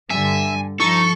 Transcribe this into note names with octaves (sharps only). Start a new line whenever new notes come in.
G2 D3 E5 G#5
F3 D#4 A4 C#6